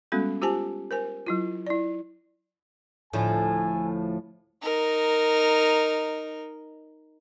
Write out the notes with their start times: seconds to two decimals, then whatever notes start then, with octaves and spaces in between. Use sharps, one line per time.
0.12 G3 G#3 B3 C#4 F#4 A4
0.42 F4 G4 C5 G#5 A5
0.91 A#4 C5 G#5
1.27 F#3 E4 F4
1.67 E4 D5
3.13 D2 A2 F3 A4 G#5
4.63 D#4 A#4